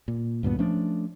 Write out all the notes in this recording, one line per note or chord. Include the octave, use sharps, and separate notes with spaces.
A#2
D2 G2 A#2 B3
F3 A3 C#4 D4